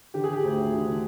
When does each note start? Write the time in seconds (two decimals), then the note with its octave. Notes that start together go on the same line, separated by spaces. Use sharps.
0.14 D3 G4
0.24 G#4
0.28 D3 G4
0.44 D2
0.58 D2
0.73 D3
0.87 D3